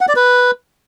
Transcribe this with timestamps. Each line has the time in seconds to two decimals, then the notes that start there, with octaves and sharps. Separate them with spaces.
0.01 F#5
0.08 D5
0.16 B4